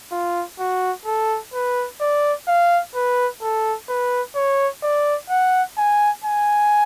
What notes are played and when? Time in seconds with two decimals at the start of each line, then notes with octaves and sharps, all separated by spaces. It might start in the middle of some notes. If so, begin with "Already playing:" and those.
0.12 F4
0.59 F#4
1.06 A4
1.54 B4
2.00 D5
2.48 F5
2.95 B4
3.42 A4
3.89 B4
4.35 C#5
4.83 D5
5.30 F#5
5.77 G#5
6.24 G#5